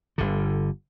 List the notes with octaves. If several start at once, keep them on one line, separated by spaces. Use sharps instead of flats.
G1 D3